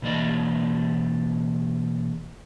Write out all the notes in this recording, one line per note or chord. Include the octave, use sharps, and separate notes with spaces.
B2 E3 A#3 D5 D#5